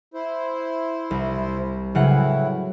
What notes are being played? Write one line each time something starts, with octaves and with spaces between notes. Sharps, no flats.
E4 C5
C2
A2 C#3 E3 F#3 E4 F#5